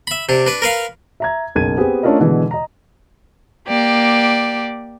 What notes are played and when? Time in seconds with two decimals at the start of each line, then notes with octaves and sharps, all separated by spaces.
0.07 E5 B5
0.29 C3 D4
0.46 D4 B4
0.62 A#4 B4 F5
1.20 E5 A#5 G#6
1.55 F#1 B1 A#4 G#6 D#7
1.78 B3 C4 G4 G#4
2.03 A3 C#4 D4 F4 A#4 D#5
2.20 B2 D3 E3 G#3
2.51 D#5 A#5
3.68 A#3 G4 D5